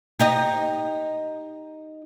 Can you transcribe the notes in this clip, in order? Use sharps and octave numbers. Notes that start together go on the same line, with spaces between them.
D#4 G4 D#5